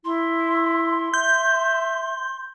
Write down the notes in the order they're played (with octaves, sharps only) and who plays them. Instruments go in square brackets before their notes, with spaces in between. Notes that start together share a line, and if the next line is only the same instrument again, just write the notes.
[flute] E4 [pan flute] C6
[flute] E5 [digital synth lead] G6